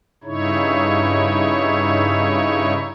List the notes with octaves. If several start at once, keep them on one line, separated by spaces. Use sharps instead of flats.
G2 C#3 D#4 E4 C#5